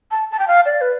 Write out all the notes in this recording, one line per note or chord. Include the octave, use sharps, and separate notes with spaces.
A5
A5
G5
F5
D5
B4